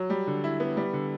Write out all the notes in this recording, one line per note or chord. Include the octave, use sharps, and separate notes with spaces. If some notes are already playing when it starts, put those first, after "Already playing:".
Already playing: F#3
G3
D3
E4
B3
G3
D3